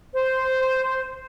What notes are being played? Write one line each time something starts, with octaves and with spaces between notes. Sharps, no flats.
C5